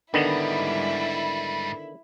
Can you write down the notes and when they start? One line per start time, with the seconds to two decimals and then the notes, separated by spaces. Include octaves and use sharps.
0.14 G#2 D3 D#3 G3 B3 E4